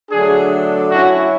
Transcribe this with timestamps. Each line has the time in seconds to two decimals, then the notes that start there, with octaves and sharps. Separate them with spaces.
0.11 D3 F#3 A3 D4 G#4
0.91 F#3 C#4 E4 F#4